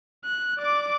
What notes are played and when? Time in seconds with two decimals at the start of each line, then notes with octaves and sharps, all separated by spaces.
0.25 F#6
0.59 D5 D6